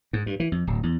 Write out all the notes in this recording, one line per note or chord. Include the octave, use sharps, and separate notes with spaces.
G#2
G2
E3
F2
D1
E2